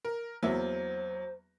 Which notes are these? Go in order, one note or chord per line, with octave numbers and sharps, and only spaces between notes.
A#4
E2 F#3 A#3 C5 E5